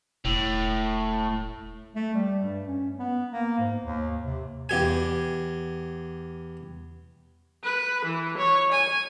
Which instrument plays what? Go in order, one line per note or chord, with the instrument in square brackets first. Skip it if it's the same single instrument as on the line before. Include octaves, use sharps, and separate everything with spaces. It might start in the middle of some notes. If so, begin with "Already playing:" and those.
[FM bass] E1 [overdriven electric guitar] A2
[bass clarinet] A3
G3
G2
C#4
B3
A#3
G#2
D#2
C3
[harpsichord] E2 G4 G#5
[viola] B4
E3
C#5
G#5